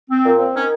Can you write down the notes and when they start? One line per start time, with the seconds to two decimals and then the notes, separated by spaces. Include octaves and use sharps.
0.09 C4
0.24 A#2
0.39 C4
0.55 D#3 C#4